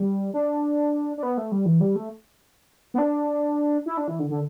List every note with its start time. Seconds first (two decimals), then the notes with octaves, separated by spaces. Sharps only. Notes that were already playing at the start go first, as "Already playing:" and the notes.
Already playing: G3
0.34 D4
1.18 D4
1.23 B3
1.38 A3
1.52 G3
1.66 E3
1.80 G3
1.96 A3
2.94 B3
2.98 D4
3.86 E4
3.97 D4
4.08 E3
4.19 D3
4.30 D3